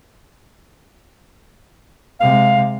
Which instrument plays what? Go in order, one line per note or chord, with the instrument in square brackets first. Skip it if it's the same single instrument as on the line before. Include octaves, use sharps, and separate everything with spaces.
[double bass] C3 G#3 [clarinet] F5